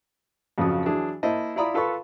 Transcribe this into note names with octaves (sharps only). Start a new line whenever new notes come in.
F2 C#3 F3 F#3 F#4 D#6
E3 F#3 D4 G#4
A#3 E4 C5 D#5 A5
E4 F4 D5 A#5 B5 D#6
F4 A4 B4 A5 B5 C#6